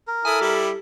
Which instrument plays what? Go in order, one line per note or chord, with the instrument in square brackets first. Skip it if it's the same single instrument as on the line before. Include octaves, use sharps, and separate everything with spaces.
[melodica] A#4
[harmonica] E4 D#6 [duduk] A4 [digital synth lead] G#5
[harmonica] G3 E4 [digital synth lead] G4